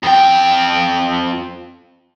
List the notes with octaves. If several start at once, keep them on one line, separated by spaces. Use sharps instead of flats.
F2 G5